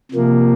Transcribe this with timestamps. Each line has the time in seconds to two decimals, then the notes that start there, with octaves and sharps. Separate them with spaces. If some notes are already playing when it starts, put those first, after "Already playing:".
0.11 C3 F3 A#3